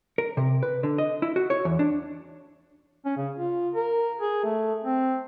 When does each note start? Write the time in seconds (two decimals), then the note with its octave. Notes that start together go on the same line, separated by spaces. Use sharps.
0.18 A#4
0.37 C3
0.63 B4
0.83 D3
0.98 D#5
1.22 E4
1.36 F#4
1.50 C#5
1.65 E2
1.79 D4
3.05 C#4
3.17 C#3
3.37 F4
3.75 A#4
4.20 G#4
4.44 A3
4.84 C4